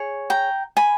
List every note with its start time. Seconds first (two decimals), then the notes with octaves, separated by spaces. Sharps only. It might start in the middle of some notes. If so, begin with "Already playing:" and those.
Already playing: G#4 C#5
0.30 G5 A#5
0.77 G#5 B5